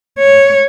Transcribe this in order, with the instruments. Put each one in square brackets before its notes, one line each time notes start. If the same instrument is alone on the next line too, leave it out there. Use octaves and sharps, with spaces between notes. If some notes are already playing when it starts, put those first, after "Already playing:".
[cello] C#5